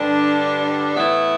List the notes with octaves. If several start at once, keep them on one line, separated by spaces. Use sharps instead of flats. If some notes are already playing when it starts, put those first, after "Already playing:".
Already playing: G2 D3 G3 D4
A2 E3 B3 E4